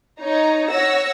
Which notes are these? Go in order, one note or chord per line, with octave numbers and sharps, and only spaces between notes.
D#4 C#5 A#5
C#5 F#5 E6 A#6